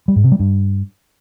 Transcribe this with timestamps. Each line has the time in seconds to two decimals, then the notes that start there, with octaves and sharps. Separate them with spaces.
0.08 G3
0.16 G#2
0.24 C3
0.32 G3
0.39 G2